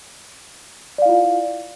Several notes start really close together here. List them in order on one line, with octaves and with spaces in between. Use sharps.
D5 F5 E4 F4